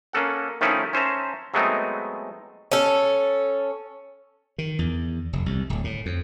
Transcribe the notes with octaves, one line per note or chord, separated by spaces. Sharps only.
A#3 C#4 A4 F#5
D#3 F3 A3 C#4 D#4 E4
C#4 C5 E5 A5 A#5
F#3 G#3 A3 B3 C4 D#4
C#4 A4
D#3
E2
F1
C2
D1
A2
F2